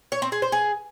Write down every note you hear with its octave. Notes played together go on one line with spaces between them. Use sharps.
C#5
C4
G#4
C5
G#4